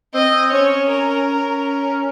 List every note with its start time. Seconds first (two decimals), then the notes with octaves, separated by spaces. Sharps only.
0.14 C4 D#5
0.52 C#4 C#5
0.90 A#4
1.28 C#4